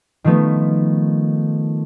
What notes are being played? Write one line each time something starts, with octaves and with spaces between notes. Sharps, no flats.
D#3 F3 A3 B3